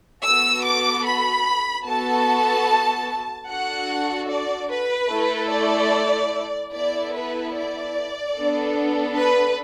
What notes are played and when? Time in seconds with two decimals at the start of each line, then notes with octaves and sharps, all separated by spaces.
0.23 B3 F#4 A4 E6
0.64 D6
1.05 B5
1.86 B3 F#4 A4 A5
3.48 D4 F#4 A4 F#5
4.30 D5
4.71 B4
5.10 A3 E4 A4
5.51 D5
6.73 B3 E4 A4 D5
7.15 B4
7.55 D5
8.36 B3 D4 A4
9.17 B4